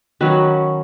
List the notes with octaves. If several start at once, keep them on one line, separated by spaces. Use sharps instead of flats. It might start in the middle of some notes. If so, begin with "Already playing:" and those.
D#3 F#3 C#4 B4